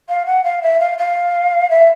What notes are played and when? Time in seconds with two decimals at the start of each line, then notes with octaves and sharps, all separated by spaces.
0.09 F5
0.26 F#5
0.43 F5
0.62 E5
0.80 F5
0.98 F5
1.70 E5